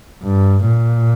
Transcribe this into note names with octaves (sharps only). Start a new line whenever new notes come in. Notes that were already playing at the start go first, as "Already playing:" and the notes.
G2
A#2